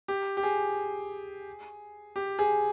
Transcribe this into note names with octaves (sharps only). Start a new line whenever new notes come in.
G4
G4
G#4
G4
G#4